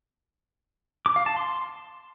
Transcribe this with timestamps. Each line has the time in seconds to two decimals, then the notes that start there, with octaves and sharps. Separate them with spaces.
1.06 D6
1.16 F5
1.26 A5
1.36 C6